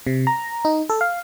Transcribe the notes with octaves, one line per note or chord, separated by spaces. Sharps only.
C3
A#5
D#4
A4
F5